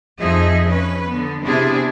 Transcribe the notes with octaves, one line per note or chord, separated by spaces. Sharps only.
F2 F3 D#4 G#4 D#5 E5
C#4 B4
D3 B3
C3 B3 C4 D4 E4 G#4